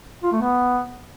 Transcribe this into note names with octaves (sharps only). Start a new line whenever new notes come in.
F4
A3
B3